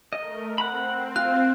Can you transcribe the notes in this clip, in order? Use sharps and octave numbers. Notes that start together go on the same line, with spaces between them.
A3 A#4 D#5
C4 F#5 B5
F4 F#6